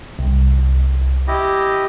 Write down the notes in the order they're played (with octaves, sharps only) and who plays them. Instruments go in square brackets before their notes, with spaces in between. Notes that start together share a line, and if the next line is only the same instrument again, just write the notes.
[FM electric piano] C2
[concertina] E4 G4 D#5